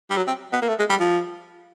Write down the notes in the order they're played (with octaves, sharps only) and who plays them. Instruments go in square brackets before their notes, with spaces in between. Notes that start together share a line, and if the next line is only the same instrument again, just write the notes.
[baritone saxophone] G3
F#3
C4
B3
A#3
A3
G#3
G3
F3